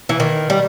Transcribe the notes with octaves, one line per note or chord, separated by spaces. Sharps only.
E3
D#3
G3